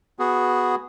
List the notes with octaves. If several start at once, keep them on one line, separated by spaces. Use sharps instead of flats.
B3 F#4 G#4